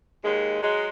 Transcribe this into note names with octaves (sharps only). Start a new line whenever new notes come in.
D#2 G#3
F#3 G#3